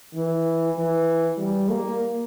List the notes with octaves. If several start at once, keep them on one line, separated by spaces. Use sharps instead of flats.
E3
E3
G3
A#3